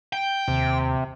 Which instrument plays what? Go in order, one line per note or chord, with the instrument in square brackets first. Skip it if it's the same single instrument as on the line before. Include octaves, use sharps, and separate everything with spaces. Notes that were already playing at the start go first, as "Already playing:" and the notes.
[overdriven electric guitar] G5
[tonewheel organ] D#2 [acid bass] C3